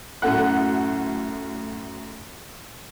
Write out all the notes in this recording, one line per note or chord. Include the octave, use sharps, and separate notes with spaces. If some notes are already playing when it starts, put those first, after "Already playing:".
F#2 A2 A3 F#5 F#6